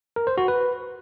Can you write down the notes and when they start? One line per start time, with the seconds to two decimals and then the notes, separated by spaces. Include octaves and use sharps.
0.16 A#4
0.27 C5
0.38 F#4
0.48 B4